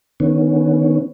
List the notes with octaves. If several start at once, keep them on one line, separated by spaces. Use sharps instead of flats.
D3 D#3 B3 C#4